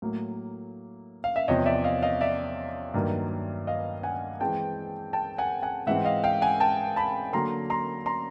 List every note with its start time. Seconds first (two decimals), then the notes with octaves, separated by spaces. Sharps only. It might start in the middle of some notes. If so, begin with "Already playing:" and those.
0.02 A2 F#3 A#3
1.24 F5
1.36 E5
1.48 E2 C3 F3 C#5 D#5
1.66 D5 E5
1.84 D#5 F5
2.02 D#5 F5
2.21 D5 E5
2.94 G2 D#3 F#3 A#3
3.67 D#5 F5
4.03 F#5 G#5
4.41 E3 G#3 C4 G5 A5
5.13 G5 A5
5.38 F#5 G#5
5.63 F#5 G#5
5.87 G#2 E3 G#3 C4 E5 F#5
6.05 D#5 F5
6.24 F5 G5
6.41 F#5 G#5
6.60 G5 A5
6.96 A5 B5
7.33 D3 F#3 A#3 A#5 C6
7.70 A#5 C6
8.06 A#5 C6